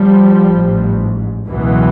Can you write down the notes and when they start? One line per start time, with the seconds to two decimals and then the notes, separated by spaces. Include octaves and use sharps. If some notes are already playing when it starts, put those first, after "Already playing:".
Already playing: F3 G3
0.45 A1 G#2
1.47 C#2 B2 E3 F#3